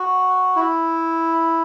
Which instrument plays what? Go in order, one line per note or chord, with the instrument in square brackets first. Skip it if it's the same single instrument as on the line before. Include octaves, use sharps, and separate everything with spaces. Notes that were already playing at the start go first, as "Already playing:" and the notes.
Already playing: [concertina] F#4
E4